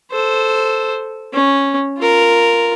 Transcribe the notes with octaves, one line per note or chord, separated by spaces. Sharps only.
A4 C5
C#4
F4 A#4